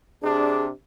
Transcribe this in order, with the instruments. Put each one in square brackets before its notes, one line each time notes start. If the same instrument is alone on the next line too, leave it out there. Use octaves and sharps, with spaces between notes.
[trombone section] C3 D4 [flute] G#4